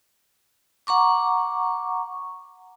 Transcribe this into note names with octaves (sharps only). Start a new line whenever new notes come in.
F#5 A#5 C#6 D6